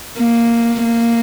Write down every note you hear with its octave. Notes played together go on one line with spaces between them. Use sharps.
A#3
A#3